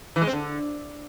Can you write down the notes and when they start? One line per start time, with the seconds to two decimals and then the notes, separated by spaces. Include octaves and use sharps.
0.16 E3
0.22 G#3
0.27 C4
0.33 D3